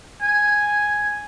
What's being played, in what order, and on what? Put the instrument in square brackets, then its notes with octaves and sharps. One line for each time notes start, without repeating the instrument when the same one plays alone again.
[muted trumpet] G#5